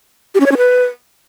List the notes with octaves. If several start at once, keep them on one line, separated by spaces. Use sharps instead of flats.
G4
C#4
C#5
C#4
B4